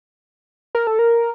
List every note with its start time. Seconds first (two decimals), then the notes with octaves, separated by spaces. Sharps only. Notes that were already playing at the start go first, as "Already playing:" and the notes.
0.75 A#4
0.87 A4
0.99 A#4